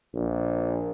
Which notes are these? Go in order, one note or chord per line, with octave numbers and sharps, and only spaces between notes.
A#1